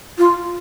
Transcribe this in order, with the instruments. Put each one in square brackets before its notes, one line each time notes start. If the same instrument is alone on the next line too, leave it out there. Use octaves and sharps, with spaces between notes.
[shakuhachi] F4